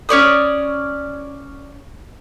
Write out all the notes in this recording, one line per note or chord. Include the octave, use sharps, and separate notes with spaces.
C#4 C#5 D5 D#6